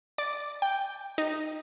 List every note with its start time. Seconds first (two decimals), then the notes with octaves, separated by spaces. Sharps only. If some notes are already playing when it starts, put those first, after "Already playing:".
0.18 D5
0.62 G5
1.18 D#4